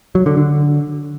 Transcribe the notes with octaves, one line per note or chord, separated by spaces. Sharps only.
F#3
D3
D3